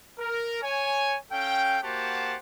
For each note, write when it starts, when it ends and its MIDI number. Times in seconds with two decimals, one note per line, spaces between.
0.19 0.61 70
0.62 1.17 73
0.62 1.17 80
1.32 1.78 61
1.32 1.78 69
1.32 1.78 77
1.32 1.78 79
1.83 2.36 58
1.83 2.36 66
1.83 2.36 67
1.83 2.36 72
1.83 2.36 78
1.83 2.36 81